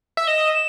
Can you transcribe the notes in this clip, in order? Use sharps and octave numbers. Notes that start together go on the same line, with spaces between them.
E5
D#5 E7
E7